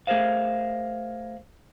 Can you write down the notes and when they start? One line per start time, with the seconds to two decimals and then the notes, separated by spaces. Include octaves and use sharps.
0.07 A3 G#4 A#4 C5 F5